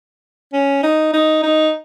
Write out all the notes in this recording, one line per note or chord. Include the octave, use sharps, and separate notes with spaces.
C#4
D#4
D#4
D#4